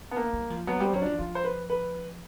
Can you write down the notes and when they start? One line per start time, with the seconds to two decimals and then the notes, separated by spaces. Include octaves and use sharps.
0.11 B3
0.17 A#3
0.33 G3
0.50 F3
0.67 F#3 B3
0.80 G3 C4
0.93 F#3 C#4
1.02 F3 D4
1.18 F3 F4
1.35 C5
1.44 B4
1.70 B4